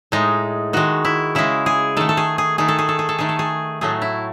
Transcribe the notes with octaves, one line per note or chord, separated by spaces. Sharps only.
A2 G#3 D#4
D#3 G#3 F#4
E4
C#3 G#3 E4
G#4
D#3 A3 A4
A4
G#4
G#4
D#3 A3 G#4
A4
G#4
A4
G#4
A4
D#3 A3 G#4
A4
G#4
A2 F#3 A3 G#4
E4